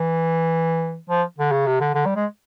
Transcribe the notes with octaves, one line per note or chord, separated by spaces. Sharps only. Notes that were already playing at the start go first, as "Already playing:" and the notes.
Already playing: E3
F3
D3
C#3
C3
D3
D3
G3
G#3